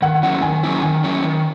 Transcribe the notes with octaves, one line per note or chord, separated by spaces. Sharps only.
D#3 F#5
F#3 C#4 E4
D#3 G#5
F#3 C#4 E4
D#3 G#5
F#3 C#4 E4
D#3